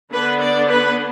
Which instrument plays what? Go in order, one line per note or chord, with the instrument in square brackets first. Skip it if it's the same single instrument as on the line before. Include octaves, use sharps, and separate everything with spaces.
[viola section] D3 B3 D4 B4
D5
B4